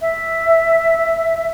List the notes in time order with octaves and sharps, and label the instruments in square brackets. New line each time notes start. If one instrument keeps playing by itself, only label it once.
[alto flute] E5